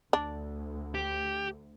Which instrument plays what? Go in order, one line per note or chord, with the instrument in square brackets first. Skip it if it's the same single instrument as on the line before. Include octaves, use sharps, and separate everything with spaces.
[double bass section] D2 [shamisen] D4
[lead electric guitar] G4